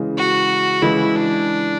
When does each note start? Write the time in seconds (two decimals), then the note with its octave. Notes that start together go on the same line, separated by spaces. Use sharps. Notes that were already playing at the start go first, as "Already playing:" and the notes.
Already playing: C#3 E3 G#3
0.17 F#4
0.82 C#3 E3 G#3 E4
1.15 D4